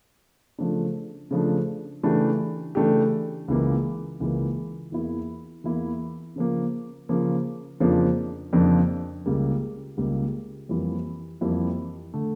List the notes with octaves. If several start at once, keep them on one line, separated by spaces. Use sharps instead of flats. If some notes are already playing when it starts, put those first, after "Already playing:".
C#3 F3 A3 D4
C#3 F3 A3 D4
C#3 E3 A3 D4 G4
C#3 E3 A3 D4 G4
C#2 C#3 E3 A#3
C#2 C#3 E3 A#3
E2 E3 A#3 E4
E2 E3 A#3 E4
C#3 F3 A#3
C#3 F3 A#3
F2 C#3 F3 A#3 D4
F2 C#3 F3 A#3 D4
C#2 C#3 G3 A#3
C#2 C#3 G3 A#3
F2 E3 G3 A#3 E4
F2 E3 G3 A#3 E4
D3 A3